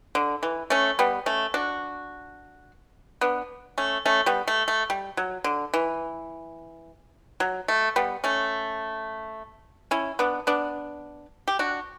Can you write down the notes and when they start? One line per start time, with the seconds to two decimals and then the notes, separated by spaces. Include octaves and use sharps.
0.15 D3
0.43 E3
0.70 A3 C#4
0.99 G3 B3
1.26 A3 C#4
1.54 D4 F#4
3.21 B3 D4
3.78 A3 C#4
4.05 A3 C#4
4.26 G3 B3
4.48 A3
4.68 A3
4.90 G3
5.17 F#3
5.44 D3
5.74 E3
7.40 F#3
7.68 A3
7.96 G3 B3
8.24 A3 C#4
9.91 C#4 E4
10.19 B3 D4
10.47 B3 D4
11.48 G4
11.59 D4 F#4